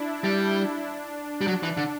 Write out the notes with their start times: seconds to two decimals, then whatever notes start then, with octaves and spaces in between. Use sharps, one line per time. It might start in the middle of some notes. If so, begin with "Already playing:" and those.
Already playing: D4 E4
0.24 G3
1.41 G3
1.47 F#3 D4
1.63 E3
1.77 D3